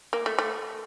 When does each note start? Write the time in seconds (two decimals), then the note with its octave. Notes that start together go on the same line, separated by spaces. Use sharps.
0.13 A#3
0.26 A3
0.39 A3